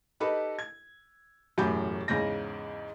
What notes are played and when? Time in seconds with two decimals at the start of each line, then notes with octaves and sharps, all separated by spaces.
0.20 D#4 G4 A4 B4 B5
0.59 G#6
1.58 E1 F#2 A2 G4 B5 G6
2.08 E2 G#2 C#3 G6 A#6